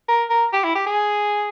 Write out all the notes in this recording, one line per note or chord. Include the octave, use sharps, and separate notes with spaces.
A#4
A#4
G4
E4
G4
G#4